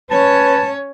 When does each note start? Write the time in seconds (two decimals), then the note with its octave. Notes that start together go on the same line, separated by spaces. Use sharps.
0.11 C#4 B4 C#5 A5